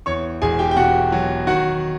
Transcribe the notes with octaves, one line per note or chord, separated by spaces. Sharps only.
E2 C#5 C#6
E1 G#4 G#5
G4 G5
G5
B2 F#4 F#5
F#3
D#3 F#4 F#5